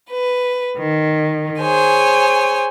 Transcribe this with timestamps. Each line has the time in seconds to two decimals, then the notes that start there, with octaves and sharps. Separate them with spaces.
0.10 B4
0.79 D#3
1.61 G#4 C5 C#5 G#5